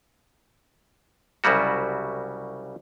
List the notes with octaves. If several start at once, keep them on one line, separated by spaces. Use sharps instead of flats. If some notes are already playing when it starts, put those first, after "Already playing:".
C2 C#3 F#3 G3 F#4